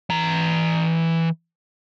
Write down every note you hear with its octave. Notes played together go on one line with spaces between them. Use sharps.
E3 A#5